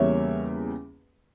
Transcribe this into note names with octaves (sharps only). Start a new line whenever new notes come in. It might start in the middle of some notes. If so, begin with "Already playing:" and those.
Already playing: E2 C#3 G3 A#3 C#5 E5